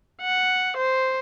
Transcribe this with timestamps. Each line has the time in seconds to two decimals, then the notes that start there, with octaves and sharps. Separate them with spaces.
0.22 F#5
0.77 C5